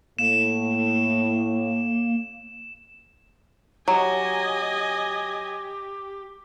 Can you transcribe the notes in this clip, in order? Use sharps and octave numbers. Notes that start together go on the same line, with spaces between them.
A2 A#3 E7
F#3 G4 D#5 G#5